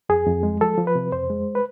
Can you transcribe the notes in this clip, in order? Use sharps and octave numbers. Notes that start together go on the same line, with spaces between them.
F2 G#4
F2
G#3
F3 A4
F3
B4
C3
F2 C5
G#3
B4